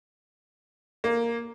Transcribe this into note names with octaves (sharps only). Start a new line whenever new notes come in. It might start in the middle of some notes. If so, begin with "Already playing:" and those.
A#3